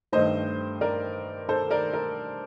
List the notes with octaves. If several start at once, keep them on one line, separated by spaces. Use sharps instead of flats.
G2 D#3 A3 C5 D#5
A#4 D5
A4 C5
A#4 D5
A#4